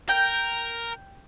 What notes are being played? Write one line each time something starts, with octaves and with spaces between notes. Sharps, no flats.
A#4 G5